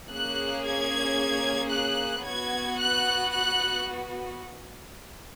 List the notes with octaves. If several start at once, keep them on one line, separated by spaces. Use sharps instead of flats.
A#3 C#4 G#4 F#6
G#6
F#6
B3 F#4 G#6
F#6
F#6